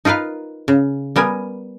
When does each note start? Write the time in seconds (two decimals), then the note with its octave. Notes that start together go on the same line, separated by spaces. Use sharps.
0.05 D#4 F4 A#4 B4 F5
0.68 C#3
1.16 G3 B3 A#4 G#5